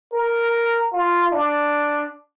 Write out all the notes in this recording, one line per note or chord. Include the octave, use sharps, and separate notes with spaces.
A#4
F4
D4